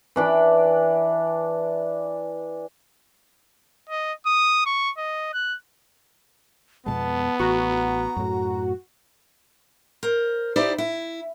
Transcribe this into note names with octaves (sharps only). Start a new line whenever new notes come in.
E3 D4 B4
D#5
D#6
C#6
D#5
F#6
F2 B2 G#3 B3 A5
A1 F#4 A#5
F#2 A2
A#4 C5
D#4 E4 G4 C5 D5
E4